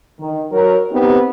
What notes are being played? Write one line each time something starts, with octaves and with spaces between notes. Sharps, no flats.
D#3
F#3 A#4
B3 C4 D#4 G4